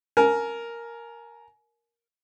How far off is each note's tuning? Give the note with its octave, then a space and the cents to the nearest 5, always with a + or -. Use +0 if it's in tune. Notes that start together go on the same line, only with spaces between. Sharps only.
A#4 +0 G#5 +30